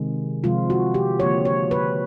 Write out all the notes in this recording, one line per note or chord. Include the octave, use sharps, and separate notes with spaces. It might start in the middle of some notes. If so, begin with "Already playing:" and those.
Already playing: C3 D#3 G#3
C3 F3 G#3 F4
F#4
G4
D3 F3 A#3 C#5
C#5
B4